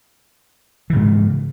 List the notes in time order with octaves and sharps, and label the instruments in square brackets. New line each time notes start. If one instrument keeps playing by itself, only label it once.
[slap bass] E3
C#3
G#2